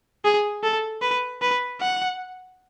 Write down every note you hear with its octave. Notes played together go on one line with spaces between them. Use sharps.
G#4
A4
B4
B4
F#5